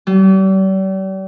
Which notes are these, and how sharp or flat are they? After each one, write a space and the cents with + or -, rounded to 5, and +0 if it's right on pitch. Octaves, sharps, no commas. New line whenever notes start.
G3 -40